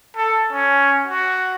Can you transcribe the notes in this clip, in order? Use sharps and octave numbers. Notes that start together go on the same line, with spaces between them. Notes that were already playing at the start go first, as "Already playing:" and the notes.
A4
C#4
F#4